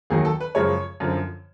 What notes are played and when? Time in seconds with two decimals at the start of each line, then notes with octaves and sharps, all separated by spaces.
0.10 D#2 D#3 F#3 G#4
0.25 A4
0.41 B4
0.55 F#2 C#3 F3 G#3 C#5
1.00 F#2 D3 F3